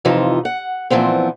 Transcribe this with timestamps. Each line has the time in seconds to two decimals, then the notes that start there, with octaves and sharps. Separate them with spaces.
0.05 F2 C3 E3 F3 D#4
0.45 F#5
0.90 A#2 E3 F3 B3 C4